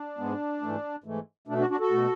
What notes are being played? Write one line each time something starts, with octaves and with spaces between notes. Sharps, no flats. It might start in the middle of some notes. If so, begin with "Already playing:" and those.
Already playing: D4
G#2 G#3 B3
G#2 E3 A3
G#2 E3 A3
B2 A3 D4
D4 F#4
D4 F#4
F#4 A4
B2 A3